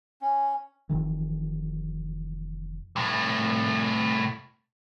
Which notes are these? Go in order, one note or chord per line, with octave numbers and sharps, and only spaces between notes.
C#4
F1 D#3 E3
C2 A2